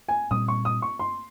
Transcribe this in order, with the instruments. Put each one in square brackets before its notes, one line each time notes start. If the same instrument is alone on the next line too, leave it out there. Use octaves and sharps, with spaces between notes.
[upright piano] G#5
[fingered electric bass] A#2 G3 C4 [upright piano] D#6
[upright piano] C#6
D#6
C#6
C6